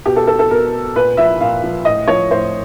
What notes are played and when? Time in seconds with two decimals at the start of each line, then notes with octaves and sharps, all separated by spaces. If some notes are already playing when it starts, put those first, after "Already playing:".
0.06 B2 G4
0.16 A4
0.27 A4
0.39 A4
0.51 B2 A#4
0.95 A#2 B4
1.17 F3 E5
1.40 A#2 F5
1.63 F3
1.85 A2 D#5
2.08 F3 C#5
2.30 A2 C5